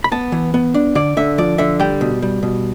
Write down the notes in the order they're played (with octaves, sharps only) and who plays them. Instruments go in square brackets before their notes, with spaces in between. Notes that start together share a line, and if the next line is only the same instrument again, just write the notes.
[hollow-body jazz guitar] B5
B3 A5
E3
B3
D4
D3 D5
D3 E5
F3 D5
D3 E5
G3 G5
B2
G3
B2